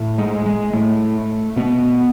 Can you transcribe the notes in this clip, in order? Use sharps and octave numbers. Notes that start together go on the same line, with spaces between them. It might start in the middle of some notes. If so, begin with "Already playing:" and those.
Already playing: A2
G#3
G#3
A2 A3
B2 B3